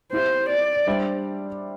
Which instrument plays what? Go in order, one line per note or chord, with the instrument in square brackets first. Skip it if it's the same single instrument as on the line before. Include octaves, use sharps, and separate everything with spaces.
[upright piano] C4 E4 G4 E5 [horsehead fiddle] C5
[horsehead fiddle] D5
[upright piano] G3 D4 C5 E5